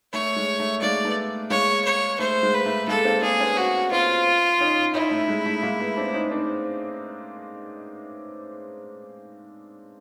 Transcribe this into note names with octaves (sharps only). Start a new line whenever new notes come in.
A3 C#5
G#3
A3
G#3 A#3 D5
A3 B3
G#3 A#3 C#5
C#5
A3 C5
G#3
B4
A3
G#3 A#3 A4
A#3 C4
A#3 C4 G#4
B3 C#4
F#4
A#3 C4 F4
C#4 D#4
C#4 D#4 E4
A3
G#3
A3
G#3 A#3
A3 B3
C4 D4
C#4 D#4
C4 D4